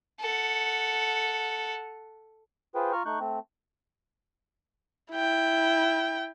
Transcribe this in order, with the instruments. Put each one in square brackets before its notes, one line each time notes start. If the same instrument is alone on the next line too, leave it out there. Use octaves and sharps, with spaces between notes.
[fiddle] A4 F#5
[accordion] F4 G#4 B4 C5 G5
F4 A#5 C#6 F6
A3 D#4 C#6 F#6 G6
A3 C4
[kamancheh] E4 G5